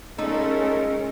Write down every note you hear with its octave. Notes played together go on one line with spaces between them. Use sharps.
G#3 A3 C#4 D#4 F4 A#4